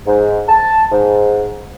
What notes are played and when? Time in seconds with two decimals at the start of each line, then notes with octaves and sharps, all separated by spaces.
0.06 G#2
0.48 A5
0.91 G#2